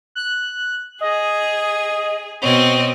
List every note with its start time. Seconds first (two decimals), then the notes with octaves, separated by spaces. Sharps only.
0.15 F#6
1.01 G#4 D#5
2.42 B2 C4 C#5 D#5